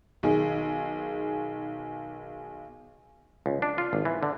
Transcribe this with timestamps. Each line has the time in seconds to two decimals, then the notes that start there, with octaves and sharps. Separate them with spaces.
0.23 B1 D#3 G#4
3.46 C#2
3.62 D4
3.78 F4
3.93 G#1
4.05 E3
4.23 D3